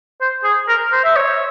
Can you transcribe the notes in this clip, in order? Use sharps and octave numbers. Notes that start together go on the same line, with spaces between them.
C5
G#4
A#4
C5
E5
C#5